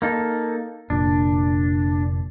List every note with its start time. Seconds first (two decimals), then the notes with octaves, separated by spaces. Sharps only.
0.02 A#3 D#4 A4
0.90 F1 A#2 D4